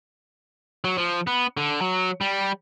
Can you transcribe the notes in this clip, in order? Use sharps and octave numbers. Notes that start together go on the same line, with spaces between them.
F#3
F3
B3
D3
F#3
G3